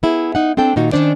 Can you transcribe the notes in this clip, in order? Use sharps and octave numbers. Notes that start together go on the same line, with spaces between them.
B3 E4 G#4
D#4 F#5
C4 D4 A4 G5
A#2 D#3 D#4 F#4
D#3 G3 C#4 D4 C5 D5